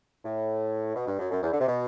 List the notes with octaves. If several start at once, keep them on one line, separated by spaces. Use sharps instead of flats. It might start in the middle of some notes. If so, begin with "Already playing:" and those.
A2
B2
G2
F#2
F#2
E2
D3
C3
B2